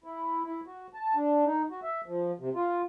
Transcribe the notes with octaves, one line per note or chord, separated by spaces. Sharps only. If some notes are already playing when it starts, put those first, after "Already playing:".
E4
E4
F#4
A5
D4
D#4
F#4
E5
F3
C3
F4